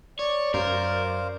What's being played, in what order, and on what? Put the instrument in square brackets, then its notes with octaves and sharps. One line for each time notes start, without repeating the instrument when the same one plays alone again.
[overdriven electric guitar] C#5 [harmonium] D5
[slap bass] F#2 [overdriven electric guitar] A#4 [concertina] C5 F5